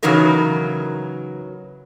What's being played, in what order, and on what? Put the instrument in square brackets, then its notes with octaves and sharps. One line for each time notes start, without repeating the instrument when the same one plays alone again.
[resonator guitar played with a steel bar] C#3 E3 F#3 D#4 A#4 B4